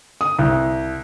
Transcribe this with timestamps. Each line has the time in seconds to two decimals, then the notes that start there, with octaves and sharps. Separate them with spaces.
0.21 D#6
0.39 C2